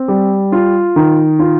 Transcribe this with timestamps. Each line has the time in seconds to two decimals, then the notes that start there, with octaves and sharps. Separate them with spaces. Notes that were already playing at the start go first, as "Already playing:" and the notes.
Already playing: C4
0.08 G3
0.52 F4
0.96 D#3
1.39 F4